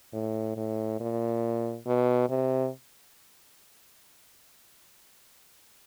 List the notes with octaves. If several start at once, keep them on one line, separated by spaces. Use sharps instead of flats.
A2
A2
A#2
B2
C3